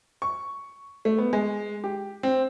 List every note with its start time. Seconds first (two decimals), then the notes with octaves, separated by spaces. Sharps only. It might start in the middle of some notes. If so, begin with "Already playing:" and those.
0.22 C#6
1.05 A3
1.18 B3
1.33 G#3
1.84 G4
2.23 C4